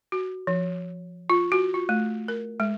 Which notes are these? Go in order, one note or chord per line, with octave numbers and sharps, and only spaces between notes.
F#4
F3
F4
F#4
F4
A3
A#4
G#3